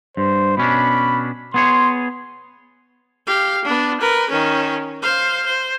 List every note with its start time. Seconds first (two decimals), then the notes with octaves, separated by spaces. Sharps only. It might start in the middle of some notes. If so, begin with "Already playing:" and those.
0.17 G2 C5
0.57 B2 C#4 D4 B5
1.54 B3 G#4 C#5 C6
3.27 G4 F5
3.64 B3 D4
4.00 A#4 B4
4.30 D#3 C#4
5.02 C5 F5
5.45 C5